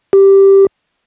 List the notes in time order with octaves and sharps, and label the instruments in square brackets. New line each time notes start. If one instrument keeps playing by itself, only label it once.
[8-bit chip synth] G4